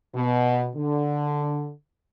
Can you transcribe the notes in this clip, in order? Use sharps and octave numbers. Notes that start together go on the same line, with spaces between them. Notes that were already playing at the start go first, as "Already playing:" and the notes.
B2
D3